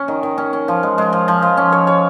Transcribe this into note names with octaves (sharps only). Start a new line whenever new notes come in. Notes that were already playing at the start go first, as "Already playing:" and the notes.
Already playing: C#4
D#3
D#3
C#4
C#4
F3
G#3
G#3
F3
F3
F3
C#4
C#5
C#5